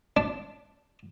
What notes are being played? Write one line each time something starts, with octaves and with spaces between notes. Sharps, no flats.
D4